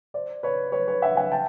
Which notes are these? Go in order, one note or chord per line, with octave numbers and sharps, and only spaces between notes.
C5 D5
B4 C#5
B4 C#5
B4 C#5
E5 F#5
F#5 G#5
G5 A5